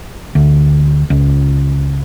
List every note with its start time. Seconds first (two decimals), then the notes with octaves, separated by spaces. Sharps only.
0.35 D2
1.10 C#2